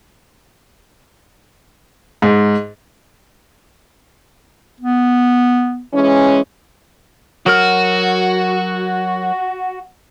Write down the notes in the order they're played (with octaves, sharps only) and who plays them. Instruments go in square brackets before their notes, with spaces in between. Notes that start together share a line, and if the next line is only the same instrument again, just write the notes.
[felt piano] G#2
[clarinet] B3
[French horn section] E3 G#3 C#4
[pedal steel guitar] F#3 A#4 F6 [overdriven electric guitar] F#4